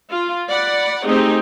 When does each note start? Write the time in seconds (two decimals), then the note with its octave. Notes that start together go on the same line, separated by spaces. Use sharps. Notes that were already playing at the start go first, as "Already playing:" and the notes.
0.11 F4
0.48 D5 F#5 B5
1.05 A3 C4 D#4 G4 G#4